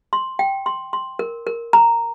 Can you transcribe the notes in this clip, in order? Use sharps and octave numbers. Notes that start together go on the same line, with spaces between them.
C6
G5
C6
C6
A#4
A#4
A#5